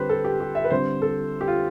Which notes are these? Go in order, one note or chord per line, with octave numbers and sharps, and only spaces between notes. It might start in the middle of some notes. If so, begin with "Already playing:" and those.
Already playing: D3 G3 C4 G4 B4 C5
A4
G4
G4
E5
B4
D3 G3 C4 C5
A4
G4
F4